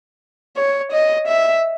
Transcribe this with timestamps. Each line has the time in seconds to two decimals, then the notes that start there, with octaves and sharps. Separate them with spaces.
0.56 C#5
0.93 D#5
1.28 E5